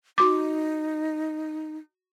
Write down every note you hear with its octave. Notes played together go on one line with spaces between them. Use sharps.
D#4 F#4 D6